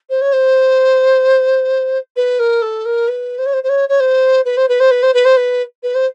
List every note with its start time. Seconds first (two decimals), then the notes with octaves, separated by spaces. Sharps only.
0.09 C5
0.21 C#5
0.32 C5
2.16 B4
2.39 A#4
2.62 A4
2.85 A#4
3.08 B4
3.38 C5
3.46 C#5
3.53 C5
3.63 C5
3.69 C#5
3.89 C#5
4.00 C5
4.45 B4
4.57 C5
4.68 B4
4.80 C5
4.91 B4
5.02 C5
5.13 B4
5.25 C5
5.36 B4
5.83 B4
5.94 C5